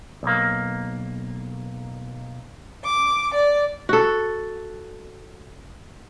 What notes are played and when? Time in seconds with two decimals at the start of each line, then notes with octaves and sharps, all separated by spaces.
0.23 B1 A#3
2.84 D6
3.34 D5
3.89 F#4 A4